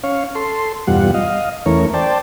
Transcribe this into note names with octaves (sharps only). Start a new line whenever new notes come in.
C#4 C#5 F5
A4 C6
E2 G2 B2 G3 F4 F#5
D#5 F5
E2 E3 A3 C#4 A#4 C#5
C5 D5 G5 A5